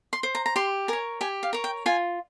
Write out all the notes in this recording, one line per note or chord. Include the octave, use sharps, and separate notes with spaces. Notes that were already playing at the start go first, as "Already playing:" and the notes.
C6
C5
A#5
A#5
G4 C6
A#4 C#5 G#5
G4 G#5
F5
A#4 C#5
G5
F4 G#5